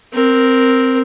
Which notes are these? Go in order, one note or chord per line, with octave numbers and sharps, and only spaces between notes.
C4 A#4